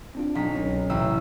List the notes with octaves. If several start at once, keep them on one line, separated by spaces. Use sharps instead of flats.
C4 D4 F4
B1 B6
C2 C#4
A1 C3 G5 E6